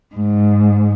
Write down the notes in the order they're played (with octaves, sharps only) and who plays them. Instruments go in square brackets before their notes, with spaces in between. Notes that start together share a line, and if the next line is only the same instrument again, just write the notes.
[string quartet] G#2